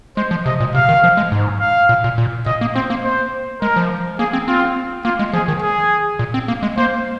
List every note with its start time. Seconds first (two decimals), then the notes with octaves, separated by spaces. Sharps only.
0.17 G#3 C5
0.31 F3
0.46 C3 D#5
0.60 A#2
0.75 C3 F5
0.89 D#3
1.04 F3
1.17 G#3
1.32 G#2
1.60 F5
1.89 A#2
2.04 A#2
2.18 A#2
2.46 A#2 D#5
2.61 A#3
2.75 C4 C5
2.90 A#3
3.04 C5
3.62 G#3 A#4
3.76 F3
4.19 A#3 G#4
4.33 C4
4.48 C4 F4
5.05 A#3 F4
5.19 G#3
5.33 F3 G#4
5.48 D#3
5.62 G#4
6.19 A#2
6.34 C4
6.48 A#3
6.63 G#3
6.77 A#3 C5